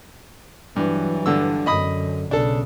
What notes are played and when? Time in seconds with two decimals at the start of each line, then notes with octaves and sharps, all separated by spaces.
0.76 G2 E3 F#3
1.26 G2 D3 E6
1.66 F#2 D3 D#5 B5 D#6
2.31 B1 C#3 D4 A4